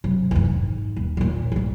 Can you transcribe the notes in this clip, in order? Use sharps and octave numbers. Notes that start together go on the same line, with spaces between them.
C3 F#3
F2 E3
G#2
D#1
D#2 A#2
C2 G#2